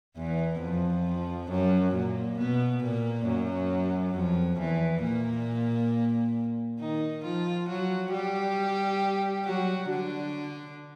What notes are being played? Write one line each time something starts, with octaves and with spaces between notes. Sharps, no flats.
E2 E3
F2 F3
F#2 F#3
A#2 A#3
B2 B3
A#2 A#3
F#2 F#3
F2 F3
E2 E3
A#2 A#3
D#3 D#4
F3 F4
F#3 F#4
G3 G4
F#3 F#4
D3 D4